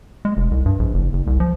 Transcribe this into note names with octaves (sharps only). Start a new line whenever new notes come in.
G#3
F1
C2
G2
A#1
F#1
F#1
C2
F3